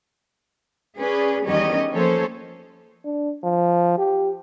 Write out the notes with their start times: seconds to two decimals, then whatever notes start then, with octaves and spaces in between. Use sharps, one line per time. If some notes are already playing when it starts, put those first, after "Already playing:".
0.98 C#4 G#4 B4 D5
1.44 E2 D#3 G3 C#4 G4 D#5
1.92 F3 A#3 C#4 A4 C5 C#5
3.05 D4
3.44 F3
3.98 G4